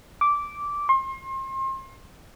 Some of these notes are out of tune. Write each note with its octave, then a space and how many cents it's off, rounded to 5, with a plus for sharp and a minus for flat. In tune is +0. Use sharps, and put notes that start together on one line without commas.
D6 -10
C6 +35